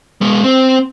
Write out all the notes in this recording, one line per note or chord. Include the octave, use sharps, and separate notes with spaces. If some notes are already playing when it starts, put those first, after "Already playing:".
G#3 B3
C4